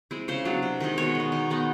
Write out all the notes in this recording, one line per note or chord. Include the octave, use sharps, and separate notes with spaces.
G#3 C4 E4
C#3 C5
F#3 B3 D4
C3
D#3 G#3
B2 C#5
G#3 B3
D#3
G#3 B3 D#4